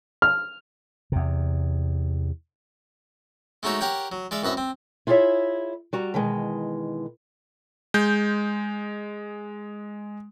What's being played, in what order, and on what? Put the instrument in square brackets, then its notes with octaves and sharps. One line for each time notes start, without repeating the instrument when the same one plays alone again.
[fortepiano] F6
[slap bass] E2 C3
[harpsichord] G#3 A3 D#4 F#4 C#5 E5
G4 A#4 C#5 F#5 G5
F#3
G#3 D5 E5 F5
C2 F#2 B4 D#5 E5
C4
[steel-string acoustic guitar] E4 F4 G#4 A4 C#5 E5
G3 F#4 A#5
B2 D#3 E3 G#3
[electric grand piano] G#3 G6